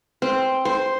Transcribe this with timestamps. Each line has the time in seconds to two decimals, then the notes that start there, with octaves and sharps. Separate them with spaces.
0.22 C4
0.65 C5